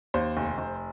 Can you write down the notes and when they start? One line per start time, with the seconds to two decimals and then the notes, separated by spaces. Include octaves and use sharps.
0.14 D#2 C5
0.37 F1
0.58 F1